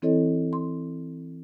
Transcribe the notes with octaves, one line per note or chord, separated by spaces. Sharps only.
E3 C4 E4 A4 C#5 D#5
C6